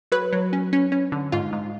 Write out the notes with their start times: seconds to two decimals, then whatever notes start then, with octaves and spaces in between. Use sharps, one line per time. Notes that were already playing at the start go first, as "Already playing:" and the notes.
0.12 F#3 B4
0.33 F#3
0.53 C#4
0.73 C#4
0.92 C#4
1.12 D3
1.32 G#2 F4
1.53 G#2